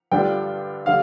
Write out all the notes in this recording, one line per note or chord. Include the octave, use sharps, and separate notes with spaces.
G2 D3 G3 D4 F4 G5
D3 G3 F5